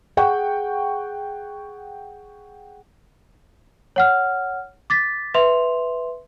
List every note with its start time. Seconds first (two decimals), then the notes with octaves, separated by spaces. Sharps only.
0.17 G#4 F#5 G5 C#6
3.96 C#5 F#5 F6
4.90 D6 A6 B6
5.34 B4 E5 C6 F7